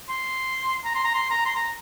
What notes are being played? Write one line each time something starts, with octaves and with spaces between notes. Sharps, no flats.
C6
A#5
C6
A#5
C6
A#5
C6
A#5